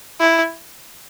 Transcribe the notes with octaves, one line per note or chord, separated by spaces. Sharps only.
E4